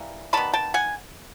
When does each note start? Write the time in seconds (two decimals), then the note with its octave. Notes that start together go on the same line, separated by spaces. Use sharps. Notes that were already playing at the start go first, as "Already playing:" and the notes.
Already playing: E3 G3 A#3
0.33 D#3 G3 B3 A5 B5
0.54 G5 A5
0.74 F#5 G#5